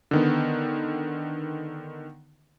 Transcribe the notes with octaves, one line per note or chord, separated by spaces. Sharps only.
D3 D#3 B3